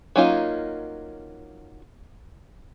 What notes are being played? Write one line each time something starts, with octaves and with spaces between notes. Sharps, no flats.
F#3 A#3 C#4 D#4 F4